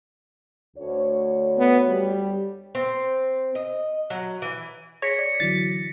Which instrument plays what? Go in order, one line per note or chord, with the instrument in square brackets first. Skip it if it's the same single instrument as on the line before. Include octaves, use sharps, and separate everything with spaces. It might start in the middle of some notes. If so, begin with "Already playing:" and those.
[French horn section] D2 C#5
[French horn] B3
G3
[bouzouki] C4
D#5
F#3
E3
[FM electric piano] G#4 [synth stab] C#5 [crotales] A#6 B6 C#7
[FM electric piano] D5 [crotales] C#7
[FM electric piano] D3 E3 F#3 [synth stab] A6